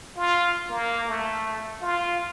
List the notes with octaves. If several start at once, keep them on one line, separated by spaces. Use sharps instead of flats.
F4
A#3
A3
F4